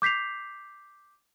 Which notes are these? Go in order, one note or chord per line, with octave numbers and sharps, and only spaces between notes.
D6 G6 B6 C7 F7